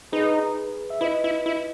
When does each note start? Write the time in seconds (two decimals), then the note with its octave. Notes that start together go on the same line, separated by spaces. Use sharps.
0.12 D#4 G#4 B4
0.90 E5
1.01 E4 B4 D#5
1.24 E4
1.46 E4